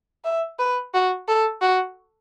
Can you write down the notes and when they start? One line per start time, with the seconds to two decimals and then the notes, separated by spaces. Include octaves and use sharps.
0.24 E5
0.59 B4
0.94 F#4
1.28 A4
1.62 F#4